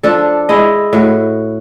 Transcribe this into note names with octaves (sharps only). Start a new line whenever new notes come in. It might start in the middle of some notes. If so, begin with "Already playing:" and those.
F3 D4 A4
G#3 E4 D#5
A2 F#4